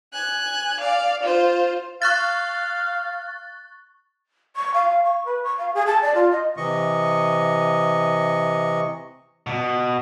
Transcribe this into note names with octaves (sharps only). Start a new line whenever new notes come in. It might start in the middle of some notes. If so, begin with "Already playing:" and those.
G#5 F#6
D5 F5
F4 C5
F5 C#6 F#6 A6
C#6
F5
C#6
B4
C#6
F5
G#4
A5
D5
F4
D#5
C3 E3 D#5 C#6
B2